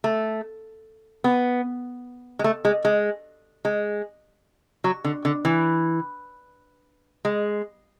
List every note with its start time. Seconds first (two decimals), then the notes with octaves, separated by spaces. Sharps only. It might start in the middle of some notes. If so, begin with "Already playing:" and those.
0.04 A3
1.24 B3
2.39 G#3
2.44 A3
2.65 G#3
2.85 G#3
3.65 G#3
4.84 F#3
5.04 D3
5.25 D3
5.45 E3
7.25 G#3